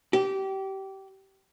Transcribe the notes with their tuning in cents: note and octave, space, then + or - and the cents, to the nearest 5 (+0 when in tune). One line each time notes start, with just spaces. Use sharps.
G4 -25